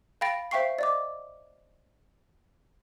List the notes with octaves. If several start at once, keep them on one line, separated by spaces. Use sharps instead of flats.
F5 G5 B5 A6 A#6 D7
C5 E5 F5 G5 C#6 C7
D5 D#5 D6